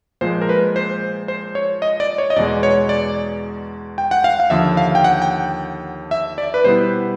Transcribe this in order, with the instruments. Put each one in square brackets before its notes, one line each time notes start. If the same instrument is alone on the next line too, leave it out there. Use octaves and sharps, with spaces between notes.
[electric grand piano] A#2 F3 G#3 C5
A#4
B4
C5
C5
C#5
D#5
D5
C#5
D#5
E2 B2 G#3 D5
C#5
D5
G5
F#5
F5
F5
D#2 D3 F3 E5
F5
G5
F#5
G5
E5
D5
B4
B2 G3 B3 E4 C5